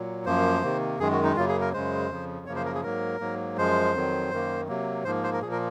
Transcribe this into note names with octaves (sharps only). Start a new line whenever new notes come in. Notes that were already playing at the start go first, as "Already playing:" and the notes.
Already playing: A#2 F#3
F#2 F3 A#3 C5
C3 D#3 A#3
F#2 D#3 G#3 G#4
F#4
D#4
F#2 C#3 F#3 A#3 F4
G#4
A#4
F#2 C#3 G#3 C5
F2 C#3 F3
F#2 C#3 F3 A#3 C#5
C5
A#4
G#4
G#2 F#3 A#3 A#4
G#2 F#3 A#3
F#2 F3 G#3 C5
F2 D#3 F#3
F#2 D#3 A#3
C3 F#3 A#3
G#2 F3 A#3 C5
C5
A#4
A#2 F3 A#3 G#4
A#4